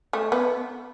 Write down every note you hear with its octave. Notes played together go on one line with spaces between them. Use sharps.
A3
B3